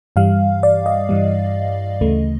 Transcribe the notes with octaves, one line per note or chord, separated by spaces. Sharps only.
G2 E3 G3 F5
D5
D#5
G2 E3 G3
D2 C#3 E3 A3